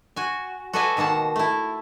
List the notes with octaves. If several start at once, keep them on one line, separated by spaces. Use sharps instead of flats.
F#4 G#5
F#4 A4 B4 D5 D#5 G#5
B2 D#3 A#3 F#5 A5
A3 E4